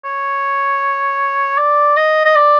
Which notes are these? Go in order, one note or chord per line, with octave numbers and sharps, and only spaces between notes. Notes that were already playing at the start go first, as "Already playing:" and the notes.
C#5
D5
D#5
D#5
D5